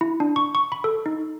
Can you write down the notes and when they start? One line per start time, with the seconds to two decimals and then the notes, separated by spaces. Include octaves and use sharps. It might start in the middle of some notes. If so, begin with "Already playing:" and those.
0.01 E4
0.20 D4
0.36 C#6
0.55 C#6
0.72 B5
0.84 A4
1.06 D#4